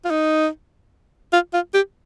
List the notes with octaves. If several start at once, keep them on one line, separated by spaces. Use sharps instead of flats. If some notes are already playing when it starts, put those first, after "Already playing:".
F4
D#4
F4
F4
G4